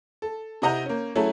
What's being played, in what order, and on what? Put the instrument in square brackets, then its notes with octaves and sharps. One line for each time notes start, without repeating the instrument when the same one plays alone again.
[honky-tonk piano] A4
C3 E4 D#5 F#5 A#5 G6
A#3 C#4
F#3 A3 C#4 E4 G#4 A4